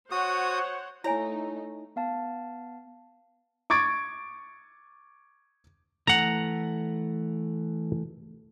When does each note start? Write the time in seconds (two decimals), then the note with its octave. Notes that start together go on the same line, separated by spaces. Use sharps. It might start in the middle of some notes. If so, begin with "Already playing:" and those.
0.11 F#4 C5 C#5 F#5 D#6
1.04 A3 D#4 E4 C#5 G#5 A#5
1.96 B3 F5 A5
3.70 C#6 D6 G#6 A6 D7
6.07 E3 A3 F#5 A#5